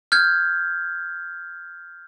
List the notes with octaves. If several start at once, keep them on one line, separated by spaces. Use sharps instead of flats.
F6 G6 G#6